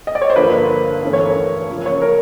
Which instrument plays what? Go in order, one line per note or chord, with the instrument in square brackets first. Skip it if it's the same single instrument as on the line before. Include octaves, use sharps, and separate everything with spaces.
[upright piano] D#5
D5
C#5
C5
G2 D3 F3 A#3 B4
G2 E3 A3 C#4
C#5
A#4
C#3 F3 A#3
C#5
A#4